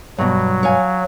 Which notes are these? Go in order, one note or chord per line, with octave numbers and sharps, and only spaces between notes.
G2 B2 F#3
C#5 F5 G#5